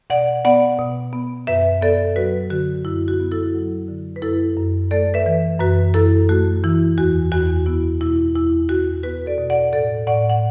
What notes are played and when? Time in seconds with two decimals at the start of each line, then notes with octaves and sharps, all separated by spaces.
0.10 B2 D5 F#5
0.45 B3 D5 F#5
0.79 B2
1.13 B3
1.47 F#2 B4 E5
1.81 B3 A4 D5
2.16 F#3 F#4 B4
2.50 D3 F#4
2.85 F#2 E4
3.08 F#4
3.20 B3
3.31 E4 A4
3.54 F#3
3.88 D3
4.16 B4
4.22 F#2 E4 A4
4.57 F#2
4.91 A3 A4 D5
5.14 B4 E5
5.26 E3
5.60 F#2 F#4 B4
5.94 F#2 E4 A4
6.29 A3 F#4
6.64 E3 E4
6.98 E2 F#4
7.32 E2 F#4
7.66 B3 E4
8.00 B2 E4
8.35 E2 E4
8.69 E2 F#4
9.03 B3 F#4 B4
9.26 A4 D5
9.38 B2
9.50 D5 F#5
9.73 A2 A4 D5
10.07 A2 D5 F#5
10.29 F#5